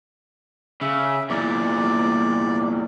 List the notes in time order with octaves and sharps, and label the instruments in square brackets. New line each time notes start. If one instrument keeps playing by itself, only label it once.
[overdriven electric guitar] C#3 [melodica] E5
[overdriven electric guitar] E2 A#2 [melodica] D5